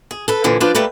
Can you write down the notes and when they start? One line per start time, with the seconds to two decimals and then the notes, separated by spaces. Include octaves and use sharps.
0.11 G#4
0.28 A4 B4
0.44 A#2 D3 E3 F3
0.60 F3 D4 F4 B4 D5
0.75 G3 A3 A#3 B4